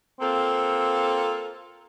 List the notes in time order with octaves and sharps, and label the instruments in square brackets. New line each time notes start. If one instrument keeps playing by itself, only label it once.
[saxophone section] A#3 F4 A4 [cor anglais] C4